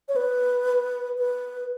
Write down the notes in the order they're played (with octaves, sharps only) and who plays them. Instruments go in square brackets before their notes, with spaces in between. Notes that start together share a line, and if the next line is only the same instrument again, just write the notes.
[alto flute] C#5
B4
B4